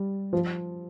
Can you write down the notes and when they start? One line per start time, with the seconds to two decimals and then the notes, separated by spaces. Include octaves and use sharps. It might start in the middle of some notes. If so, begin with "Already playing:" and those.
Already playing: G3
0.33 F3